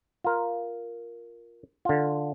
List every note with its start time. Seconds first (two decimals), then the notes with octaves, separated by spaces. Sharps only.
0.24 F4 A#4
1.85 D3 F4